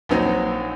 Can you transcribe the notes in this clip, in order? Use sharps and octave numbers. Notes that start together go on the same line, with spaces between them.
A#1 A#2 F#3 C4 D#4